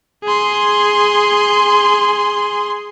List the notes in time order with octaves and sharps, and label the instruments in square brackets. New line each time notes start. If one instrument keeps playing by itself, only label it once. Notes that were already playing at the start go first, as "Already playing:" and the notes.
[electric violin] G#4 C6